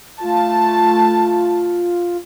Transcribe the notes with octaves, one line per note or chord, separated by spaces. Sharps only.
A3 F4 A5